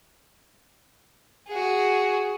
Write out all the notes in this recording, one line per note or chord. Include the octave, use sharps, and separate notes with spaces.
F#4 G#4